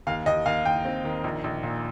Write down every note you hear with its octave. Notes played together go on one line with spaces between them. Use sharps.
D#2 F5
D#2 D#5
D#2 F5
D#2 G5
C4
D#3
A#1
A#1
A#2